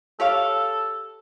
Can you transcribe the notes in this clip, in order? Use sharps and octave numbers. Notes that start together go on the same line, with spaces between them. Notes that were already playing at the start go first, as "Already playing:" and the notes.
G4 A4 C#5 F5